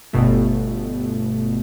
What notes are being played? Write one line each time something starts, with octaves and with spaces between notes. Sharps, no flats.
G1 B2 A3